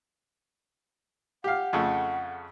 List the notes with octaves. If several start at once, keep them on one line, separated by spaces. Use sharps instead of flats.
G4 F5 F#5
F2 C#3 A3